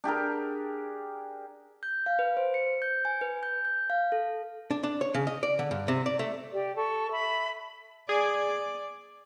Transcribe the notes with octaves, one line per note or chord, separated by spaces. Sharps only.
D4 G4 G#4 A#4
G6
F5
B4
C5
C#7
G6
G#5
B4
G6
G6
F5
A4
D4
D4
C#5
C#3
D#5
D5
D3
G2
C3
D5
A3
G4 D5
A4 C#6
E5 B5
G#4 D5 G#6